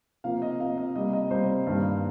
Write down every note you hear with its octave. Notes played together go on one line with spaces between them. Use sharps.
C3 F3 A#3 F5
D#5
C3 F3 A#3 F5
D#5
C3 G3 A#3 D#5
D#5
C3 G3 A#3 C5
G2 D#3 G3 A#3